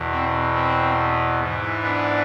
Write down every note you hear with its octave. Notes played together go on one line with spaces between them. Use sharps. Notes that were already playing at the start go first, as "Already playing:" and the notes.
Already playing: E2 B2
C4
C4
G#2 E3
B3 D4